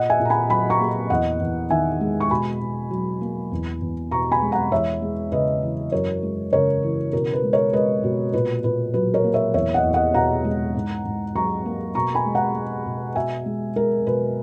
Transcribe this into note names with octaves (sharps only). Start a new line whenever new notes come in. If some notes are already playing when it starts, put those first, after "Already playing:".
Already playing: A#2 D#5 F#5
E5 G#5
A#2
A#5
G#5 B5
F#3 G#5 B5
A#5 C#6
A#3
E2 D#5 F#5
E2
D#3 E5 G#5
G#3
C#6
B2 G#5 B5
B2
F#3
A#3
E2
E2
B2 A#5 C#6
G#5 B5
G#3
F#5 A#5
E2 C#5 E5
G#3
C#3 B4 D#5
E3
F#2 A#4 C#5
G#3
C#3 A#4 C#5
E3
B2 A#4
B4
G#3
A#4 C#5
G#3 B4 D#5
B2
A#2 B4
A#2 B4
F#3 B4
A#4 C#5
A#3
C#5 E5
E2 C#5 E5
D#5 F#5
E2
D#5 F#5
B2 F#5 A#5
G#3
G#2
G#2
F#3 A#5 C#6
A#3
B2 A#5 C#6
G#5 B5
G#3
F#5 A#5
G#3
B2
B2 E5 G#5
G#3
G#3 A#4
B2 B4